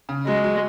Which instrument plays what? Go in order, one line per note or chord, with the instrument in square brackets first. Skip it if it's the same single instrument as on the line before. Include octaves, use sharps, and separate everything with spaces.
[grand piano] C#3
[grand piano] F#3 [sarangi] G#3
[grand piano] F#3